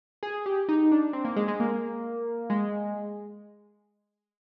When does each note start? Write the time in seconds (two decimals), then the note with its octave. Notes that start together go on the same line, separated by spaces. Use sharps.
0.23 G#4
0.46 G4
0.69 D#4
0.92 D4
1.13 C4
1.25 A#3
1.36 G#3
1.48 G#3
1.60 A#3
2.50 G#3